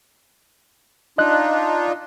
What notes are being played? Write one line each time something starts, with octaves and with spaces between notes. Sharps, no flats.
D4 D#4 F4 D#5 F#6